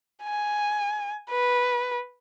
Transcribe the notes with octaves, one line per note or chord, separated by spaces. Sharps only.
G#5
B4